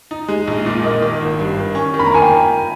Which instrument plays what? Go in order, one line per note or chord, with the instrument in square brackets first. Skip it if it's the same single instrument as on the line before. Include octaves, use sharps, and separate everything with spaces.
[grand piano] D#4
G#3
A#1
A#2
[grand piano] A#3 [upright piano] D#5
[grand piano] D#3
G#1
G2
D#3
C#4
D#3
[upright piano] B5
A#5
[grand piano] A#3 [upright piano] G#5
[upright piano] G5